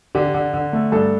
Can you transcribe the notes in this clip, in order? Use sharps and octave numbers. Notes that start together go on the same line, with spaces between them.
D3 G4
D3
D3
A3
G2 A4